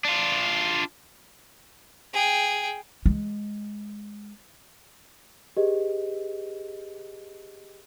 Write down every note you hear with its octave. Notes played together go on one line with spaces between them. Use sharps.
D4 F4
G#4 G5
G#3
G4 G#4 B4 D#5